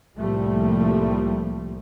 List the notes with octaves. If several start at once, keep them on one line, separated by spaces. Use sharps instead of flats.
C2 A2 F3 G3 A3 A#3